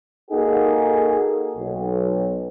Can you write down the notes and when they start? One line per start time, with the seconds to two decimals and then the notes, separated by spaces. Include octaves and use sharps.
0.31 A#3 D#4 F#4 G#4 A4
1.57 B1